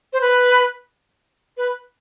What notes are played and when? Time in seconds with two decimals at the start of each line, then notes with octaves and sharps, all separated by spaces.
0.13 C5
0.21 B4
1.57 B4